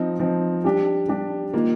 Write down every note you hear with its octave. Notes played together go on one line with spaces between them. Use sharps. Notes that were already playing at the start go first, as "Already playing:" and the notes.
Already playing: F3 C4 D#4
F3 C4 D#4
G3 D4 G4
G3 D4 G4
D#3 A#3 F4